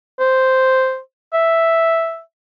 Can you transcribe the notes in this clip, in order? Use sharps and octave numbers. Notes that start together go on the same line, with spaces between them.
C5
E5